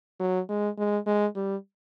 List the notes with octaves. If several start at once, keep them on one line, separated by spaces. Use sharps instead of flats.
F#3
G#3
G#3
G#3
G3